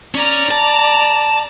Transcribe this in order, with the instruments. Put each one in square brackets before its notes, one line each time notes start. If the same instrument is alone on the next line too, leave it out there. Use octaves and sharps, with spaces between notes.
[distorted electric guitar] C#4 [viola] D5 A#5
[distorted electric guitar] A5